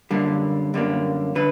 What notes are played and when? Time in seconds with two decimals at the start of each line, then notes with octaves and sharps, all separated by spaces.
0.11 F#2 D3 G3 A#3
0.74 F#2 D3 G3 A#3
1.35 D3 B4